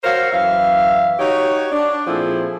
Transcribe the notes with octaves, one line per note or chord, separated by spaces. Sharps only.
F#4 A#4 C5 C#5 F5
F#2 E3 E5 F5
D#4 F#4 G4 C#5
D4
A#2 F3 C4 E4 G#4 A4